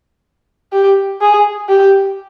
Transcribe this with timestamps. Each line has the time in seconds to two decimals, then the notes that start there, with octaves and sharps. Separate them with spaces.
0.72 G4
1.21 G#4
1.69 G4